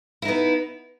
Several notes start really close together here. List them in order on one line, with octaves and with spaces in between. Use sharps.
E4 D#4 B3